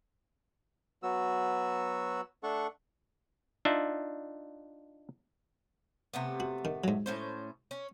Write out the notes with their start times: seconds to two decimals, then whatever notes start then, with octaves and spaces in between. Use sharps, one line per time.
1.03 F#3 B3 F#4 E6
2.43 A3 D4 A4 F#5 C#6
3.65 D4 D#4 F4 E5
6.14 C3 A3 B3
6.40 F#4
6.65 D#3
6.84 G#2 F#3
7.06 A2 C#4 C5
7.71 C#4